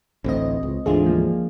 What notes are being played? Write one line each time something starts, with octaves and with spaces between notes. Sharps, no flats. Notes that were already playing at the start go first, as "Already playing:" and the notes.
A1 D2 A2 C4 D#5
C#2
D2 G#2 E3 D4 F4 G#4
F3 A#3